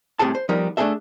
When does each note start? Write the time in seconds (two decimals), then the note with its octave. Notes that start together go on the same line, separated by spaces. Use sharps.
0.19 C2 A2 C3 G4 G#4 A5
0.35 C5
0.49 F3 G3 B3 D#4 A#4
0.77 A3 D4 D#4 G#4 A4 E5